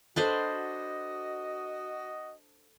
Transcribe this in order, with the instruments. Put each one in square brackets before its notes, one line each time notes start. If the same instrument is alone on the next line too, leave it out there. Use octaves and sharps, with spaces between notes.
[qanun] D4 B4 C5 [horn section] F#4 D#5 [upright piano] A4